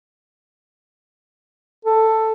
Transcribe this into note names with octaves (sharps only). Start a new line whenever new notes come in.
A4